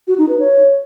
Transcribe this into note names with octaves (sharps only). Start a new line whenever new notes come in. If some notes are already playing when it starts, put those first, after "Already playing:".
F#4
D#4
B4
C#5